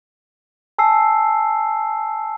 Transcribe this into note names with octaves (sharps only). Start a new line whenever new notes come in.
G#5 A5 E6 C7